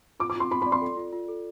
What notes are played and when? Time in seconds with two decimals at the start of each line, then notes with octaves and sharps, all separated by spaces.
0.20 F4 D6
0.30 D6
0.35 F4 C6
0.50 F4 B5
0.62 B5
0.66 D5
0.72 C6
0.81 A4
0.97 F4
1.13 F4
1.28 A4